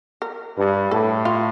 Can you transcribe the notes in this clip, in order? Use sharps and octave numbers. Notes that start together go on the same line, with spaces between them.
A#4
G2
A2 A4
F4